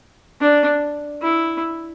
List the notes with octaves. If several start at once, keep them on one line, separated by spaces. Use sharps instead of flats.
D4
E4